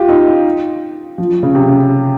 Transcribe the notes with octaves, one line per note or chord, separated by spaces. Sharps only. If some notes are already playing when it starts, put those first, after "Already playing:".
Already playing: F4 G4
D#4
F3
C#3
C3